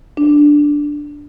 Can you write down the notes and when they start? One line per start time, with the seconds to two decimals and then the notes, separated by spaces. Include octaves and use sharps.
0.17 D4